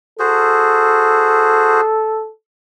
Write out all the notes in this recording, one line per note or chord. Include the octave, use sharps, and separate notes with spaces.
F#4 G#4 A4 C5